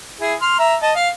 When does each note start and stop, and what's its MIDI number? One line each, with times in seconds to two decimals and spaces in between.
0.21 0.34 64
0.21 0.34 68
0.42 0.56 84
0.42 0.56 89
0.59 0.75 76
0.59 0.75 82
0.82 0.91 75
0.82 0.91 81
0.95 1.09 77